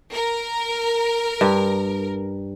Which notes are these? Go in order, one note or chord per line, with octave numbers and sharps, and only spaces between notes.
A#4
G2